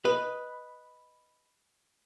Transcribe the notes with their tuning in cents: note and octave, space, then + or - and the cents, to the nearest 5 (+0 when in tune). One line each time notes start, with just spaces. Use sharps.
B4 +0 D#5 +0